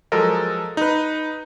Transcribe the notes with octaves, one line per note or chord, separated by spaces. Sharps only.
F3 F#3 G#3 A4 A#4 D#5
D#4 B4